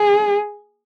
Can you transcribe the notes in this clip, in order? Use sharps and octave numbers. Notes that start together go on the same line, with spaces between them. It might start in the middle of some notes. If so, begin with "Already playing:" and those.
Already playing: G#4